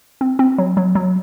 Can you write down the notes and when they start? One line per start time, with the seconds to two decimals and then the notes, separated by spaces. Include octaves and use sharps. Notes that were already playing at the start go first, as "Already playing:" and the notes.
0.21 C4
0.39 C4
0.58 F#3
0.77 F#3
0.95 F#3